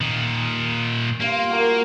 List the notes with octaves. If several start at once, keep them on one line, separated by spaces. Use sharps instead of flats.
A#2 D#3
G2 A#3 F4
F#4 A#4